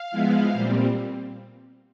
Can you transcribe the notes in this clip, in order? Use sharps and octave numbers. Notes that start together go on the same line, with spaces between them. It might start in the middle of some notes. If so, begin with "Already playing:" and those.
Already playing: F5
F3 G#3 B3 E4
A#2 G3 C4